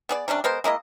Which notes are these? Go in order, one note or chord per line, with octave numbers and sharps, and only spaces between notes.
B3 G#4 D5
C3 G3 C#4 D4
G#3 B3 A#4 C5
G#3 A#3 E4 D#5